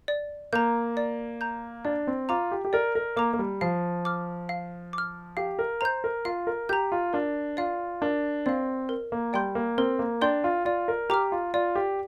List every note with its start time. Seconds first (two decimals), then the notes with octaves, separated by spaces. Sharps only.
0.08 D5
0.53 A#3 A#5 G6
0.97 D5
1.41 A#5 G6
1.85 D4 D5
2.07 C4
2.29 F4 A#5 D6
2.52 G4
2.65 G4
2.73 A#4 D5
2.95 A#4
3.16 A#3 A#5 D6
3.33 A#3
3.39 G3
3.61 F3 F5
4.05 D6 F6
4.49 F5
4.93 D6 F6
5.37 G4 F5
5.59 A#4
5.81 C5 A#5 G6
6.04 A#4
6.25 F4 F5
6.47 A#4
6.69 G4 A#5 G6
6.92 F4
7.13 D4 A#4
7.57 F4 D5 F5
8.02 D4 A#4
8.46 C4 D5 F5
8.89 A#4
9.12 A#3
9.33 G3 D5 G5 C6 G6
9.55 A#3
9.78 C4 A#4
9.99 A#3
10.21 D4 D5 G5 C6 G6
10.44 F4
10.65 F4 D5
10.88 A#4
11.10 G4 A#5 D6 F6
11.32 F4
11.54 F4 D5
11.75 G4